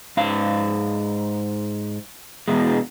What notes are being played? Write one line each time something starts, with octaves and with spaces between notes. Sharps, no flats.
G#2 F5
E2 B2 G#3